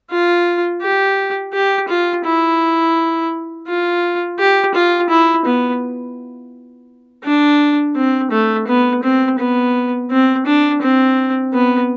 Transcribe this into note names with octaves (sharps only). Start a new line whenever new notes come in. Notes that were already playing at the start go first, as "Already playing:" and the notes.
F4
G4
G4
F4
E4
F4
G4
F4
E4
B3
D4
C4
A3
B3
C4
B3
C4
D4
C4
B3